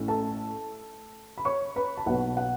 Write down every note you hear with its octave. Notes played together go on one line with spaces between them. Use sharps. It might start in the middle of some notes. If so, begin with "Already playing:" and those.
Already playing: A1 A2 A3 C#4
A4 A5
B5
C#5 C#6
B4 B5
A5
B1 B2 B3 F#5
F#5